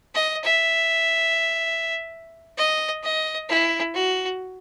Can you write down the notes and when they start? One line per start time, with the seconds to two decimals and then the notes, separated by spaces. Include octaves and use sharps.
0.15 D#5
0.44 E5
2.58 D#5
3.03 D#5
3.49 E4
3.94 F#4